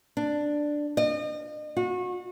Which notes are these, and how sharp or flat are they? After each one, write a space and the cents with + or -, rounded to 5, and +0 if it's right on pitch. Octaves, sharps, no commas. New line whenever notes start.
D4 +5
D#5 -40
F#4 -30